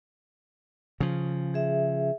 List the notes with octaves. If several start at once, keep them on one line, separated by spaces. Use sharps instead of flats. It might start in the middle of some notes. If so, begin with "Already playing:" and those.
C#3 F3
G#4 E5